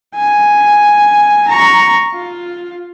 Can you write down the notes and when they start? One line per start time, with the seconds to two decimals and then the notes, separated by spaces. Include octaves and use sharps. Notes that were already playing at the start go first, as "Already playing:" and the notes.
0.15 G#5
1.48 A#5 C#6
2.13 F4